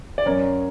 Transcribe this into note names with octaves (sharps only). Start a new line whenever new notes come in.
D5
F#2 A#4 C#5